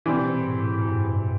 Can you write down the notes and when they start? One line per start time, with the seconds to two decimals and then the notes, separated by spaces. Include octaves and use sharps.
0.06 B2 E3 G3 C4
0.29 A#2
0.41 G#2
0.50 A2
0.72 G#2
0.81 F#2
0.89 G2
1.05 B2